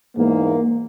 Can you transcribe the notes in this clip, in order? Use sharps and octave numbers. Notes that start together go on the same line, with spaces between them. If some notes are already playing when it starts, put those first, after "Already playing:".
E2 G#2 A#3